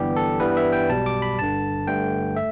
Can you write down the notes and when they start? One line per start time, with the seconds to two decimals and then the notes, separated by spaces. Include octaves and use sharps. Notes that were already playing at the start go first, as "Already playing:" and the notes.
Already playing: G1 G2 E3 G3 B3 G4
0.16 A4
0.40 G2 E3 G3 B3 B4
0.57 E5
0.73 G5
0.89 B1 B2 G3 A5
1.06 D6
1.22 B5
1.38 G1 G2 D3 A5
1.87 G2 D3 A3 G5
2.36 A3 E5